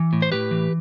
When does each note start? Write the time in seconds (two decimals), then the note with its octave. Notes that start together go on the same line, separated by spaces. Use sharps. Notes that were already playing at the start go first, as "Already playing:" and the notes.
Already playing: E3
0.13 A2
0.22 C5
0.32 A2 G4 B4
0.51 E3